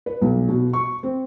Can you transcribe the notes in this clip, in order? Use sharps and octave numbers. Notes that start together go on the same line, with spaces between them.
B4
B1
B2
C#6
C4